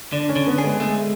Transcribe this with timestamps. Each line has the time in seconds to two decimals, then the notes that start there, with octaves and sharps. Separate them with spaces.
0.12 D3 D4
0.29 C#4
0.36 D3
0.47 B3
0.58 G#4
0.64 G#3
0.80 A3